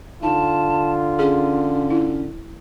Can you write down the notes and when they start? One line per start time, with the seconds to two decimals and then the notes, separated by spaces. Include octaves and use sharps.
0.23 D3 D#4 F4 A5
1.19 C#4 G#4
1.90 E4